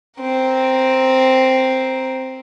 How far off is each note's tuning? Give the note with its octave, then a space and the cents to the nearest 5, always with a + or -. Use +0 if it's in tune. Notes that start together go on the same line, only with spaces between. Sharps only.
C4 +0 A#4 +0